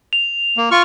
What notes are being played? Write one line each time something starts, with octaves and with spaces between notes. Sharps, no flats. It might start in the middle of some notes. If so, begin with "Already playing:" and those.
F7
A#3
F4 C#6 F6